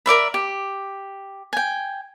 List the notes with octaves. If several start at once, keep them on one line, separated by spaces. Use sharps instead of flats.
A#4 D5 E5 B5
G4
G5 G#5